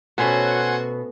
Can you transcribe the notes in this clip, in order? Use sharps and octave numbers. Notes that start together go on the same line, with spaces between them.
B2 A3 C#4 F#4 C5 F#5 G#5 C6